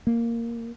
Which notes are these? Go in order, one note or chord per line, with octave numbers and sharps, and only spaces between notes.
A#3